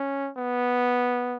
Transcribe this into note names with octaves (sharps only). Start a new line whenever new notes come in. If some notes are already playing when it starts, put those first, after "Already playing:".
Already playing: C#4
B3